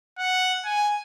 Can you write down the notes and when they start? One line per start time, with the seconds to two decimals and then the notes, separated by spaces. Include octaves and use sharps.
0.19 F#5
0.65 G#5